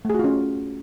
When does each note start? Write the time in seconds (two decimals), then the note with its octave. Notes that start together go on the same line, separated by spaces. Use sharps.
0.05 A3
0.10 G#4
0.14 F#4
0.19 F4
0.24 C#4